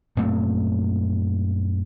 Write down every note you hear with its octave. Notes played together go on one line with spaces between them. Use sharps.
F#2 A#2 A3 C4